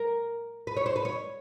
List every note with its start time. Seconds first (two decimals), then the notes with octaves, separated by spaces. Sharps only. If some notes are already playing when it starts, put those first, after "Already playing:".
Already playing: A#4
0.67 B4
0.77 C#5
0.86 C5
0.96 B4
1.05 C#5